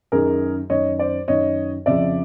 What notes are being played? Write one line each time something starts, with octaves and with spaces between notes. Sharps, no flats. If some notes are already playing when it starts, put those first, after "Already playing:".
F#2 D#3 G#4 A#4
F#2 D#3 C#5 D#5
C5 D5
F#2 D#3 C#5 D#5
F2 C#3 F3 D5 E5